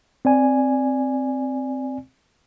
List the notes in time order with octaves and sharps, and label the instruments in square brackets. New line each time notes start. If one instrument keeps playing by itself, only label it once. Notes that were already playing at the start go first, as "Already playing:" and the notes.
[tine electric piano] C4 D5 G#5